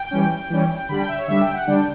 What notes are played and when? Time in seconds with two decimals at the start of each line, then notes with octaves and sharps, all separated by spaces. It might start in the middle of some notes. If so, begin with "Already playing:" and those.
Already playing: G5
0.11 E3 G3 C#4
0.50 E3 G3 C#4
0.89 D3 G3 D4 B5
0.99 G5
1.09 E5
1.18 C#5
1.28 D3 G3 D4 E5
1.41 G5
1.54 F#5
1.67 D3 G3 D4 G5